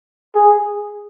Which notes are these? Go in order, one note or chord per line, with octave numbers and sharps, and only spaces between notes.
G#4